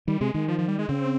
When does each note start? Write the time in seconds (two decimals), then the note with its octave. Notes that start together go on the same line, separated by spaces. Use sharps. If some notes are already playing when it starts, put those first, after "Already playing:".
0.08 D#3 G3
0.21 C3 G#3
0.34 D#3 G#3
0.48 F3
0.59 F3
0.68 G3
0.79 G#3
0.89 C#3 C4